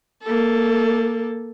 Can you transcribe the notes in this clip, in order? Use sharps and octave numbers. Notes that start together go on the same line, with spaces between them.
A#3 A4